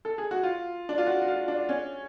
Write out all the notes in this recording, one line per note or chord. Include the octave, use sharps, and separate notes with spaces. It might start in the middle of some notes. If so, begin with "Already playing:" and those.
A4
G#4
F#4
F4
D4
F4
F#4
F#4
F4
D4
C#4